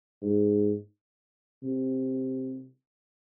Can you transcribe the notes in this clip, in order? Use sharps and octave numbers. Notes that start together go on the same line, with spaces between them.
G#2
C3